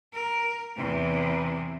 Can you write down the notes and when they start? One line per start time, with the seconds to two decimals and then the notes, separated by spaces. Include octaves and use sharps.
0.13 A#4
0.76 E2 C3